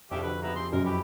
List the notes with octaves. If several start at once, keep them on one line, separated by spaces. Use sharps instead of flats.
F2 C3 D#3 D4 E4 G4
D3 F#4 B4
C#3 B3 E4 G4 B4 A#5
C4 G4 G#4 C6
F#2 G#3 A#4
E4 G4 B4 C#5 B5